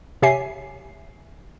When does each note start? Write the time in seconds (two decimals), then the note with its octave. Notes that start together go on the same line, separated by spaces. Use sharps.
0.22 C3 G4 C#5 E5 G#5 C7